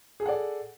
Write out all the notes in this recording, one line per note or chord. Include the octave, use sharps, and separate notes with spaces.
G#4 A4 D5 F#5